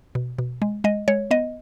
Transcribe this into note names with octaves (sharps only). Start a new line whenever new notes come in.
B2
B2
G#3
G#3 D#5
G#3 C#5
B3 D#5